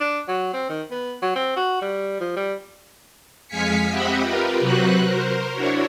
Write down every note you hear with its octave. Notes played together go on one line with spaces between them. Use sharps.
D4
F#3
C4
D#3
B3
F#3
C4
F#4
G3
F3
G3
F2 G#3 F5 G#5 B6 C#7
C4 G4 D#5 E5 F#5 B5
F4 G4 A#4 B4
C3 F#3 F#4 B4 C5 F#6
A#4 C5
D4 E4 F#4 C#5